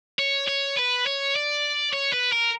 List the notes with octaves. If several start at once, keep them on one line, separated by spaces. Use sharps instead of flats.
C#5
C#5
B4
C#5
D5
C#5
B4
A#4